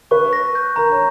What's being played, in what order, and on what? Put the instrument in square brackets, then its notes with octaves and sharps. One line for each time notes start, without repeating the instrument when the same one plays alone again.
[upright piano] B4 [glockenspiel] C#6
[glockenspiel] A#6
G6
[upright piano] A#4 [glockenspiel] A#5
[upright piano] C#5